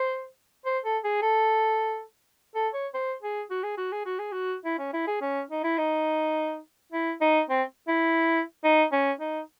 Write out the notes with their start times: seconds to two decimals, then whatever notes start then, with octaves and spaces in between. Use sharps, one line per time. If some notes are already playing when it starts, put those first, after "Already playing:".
Already playing: C5
0.65 C5
0.85 A4
1.04 G#4
1.22 A4
2.55 A4
2.74 C#5
2.94 C5
3.23 G#4
3.50 F#4
3.64 G#4
3.77 F#4
3.92 G#4
4.06 F#4
4.19 G#4
4.32 F#4
4.65 E4
4.79 C#4
4.93 E4
5.07 G#4
5.21 C#4
5.50 D#4
5.63 E4
5.78 D#4
6.92 E4
7.21 D#4
7.49 C4
7.88 E4
8.64 D#4
8.92 C#4
9.20 D#4